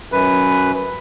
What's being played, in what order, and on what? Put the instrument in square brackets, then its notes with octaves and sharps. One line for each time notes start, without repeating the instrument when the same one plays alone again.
[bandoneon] F#2 B4